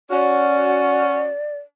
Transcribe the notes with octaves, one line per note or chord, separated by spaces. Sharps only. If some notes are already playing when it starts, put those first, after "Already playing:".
C#4 F#4 D5